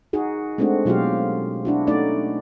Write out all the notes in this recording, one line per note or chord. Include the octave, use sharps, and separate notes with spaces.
D#4 F#4 G#4
G#3 A3 C4 D4 F#4
B2 F#3 F4 G4 G#4 F5
D4 E4 F#4
A3 C#4 D#4 F#4 D5